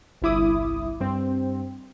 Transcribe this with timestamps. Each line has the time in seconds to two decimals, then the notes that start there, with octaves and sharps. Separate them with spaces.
0.22 G1 C2 E4 D6 D#6
1.00 G2 C4